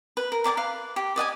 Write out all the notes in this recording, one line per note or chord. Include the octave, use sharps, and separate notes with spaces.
B4
A#4
A#4 D5 G#5 D6
B4 F5
G4
D5 D#5 F#5 G#5